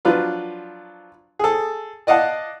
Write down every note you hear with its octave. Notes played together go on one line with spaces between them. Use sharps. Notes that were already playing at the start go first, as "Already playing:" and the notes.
F3 F#3 D4 F4 B4
G#4 A4
D5 D#5 F5 F#5 A5